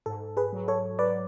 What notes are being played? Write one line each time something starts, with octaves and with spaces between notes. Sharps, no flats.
G#2 A4
G#4 B4
F#3
A4 C#5
F#3 B4 D5